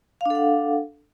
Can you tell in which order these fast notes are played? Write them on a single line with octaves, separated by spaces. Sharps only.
F5 D4 A4 F#5